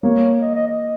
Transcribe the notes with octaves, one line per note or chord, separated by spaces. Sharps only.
A#3 C#5
D#5
D#5
D#5